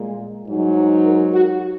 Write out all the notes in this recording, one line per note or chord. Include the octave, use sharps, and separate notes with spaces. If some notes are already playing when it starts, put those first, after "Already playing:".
Already playing: A#2 G#3
G#2 F#3 D#4
A#4
F#4